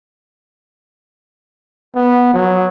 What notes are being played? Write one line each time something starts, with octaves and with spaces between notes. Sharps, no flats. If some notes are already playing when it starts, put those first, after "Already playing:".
B3
F#3